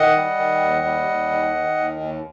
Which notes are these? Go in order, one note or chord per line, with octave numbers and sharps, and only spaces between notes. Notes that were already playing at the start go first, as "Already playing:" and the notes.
Already playing: D#3 D#5 F#5
G3
D#3
D#2
G3
D#2
D#3
D#3
D#2
D#2